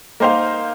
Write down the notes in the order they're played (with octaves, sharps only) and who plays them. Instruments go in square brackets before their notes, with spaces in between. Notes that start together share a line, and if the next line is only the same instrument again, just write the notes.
[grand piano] A#3 D#4 C5 F5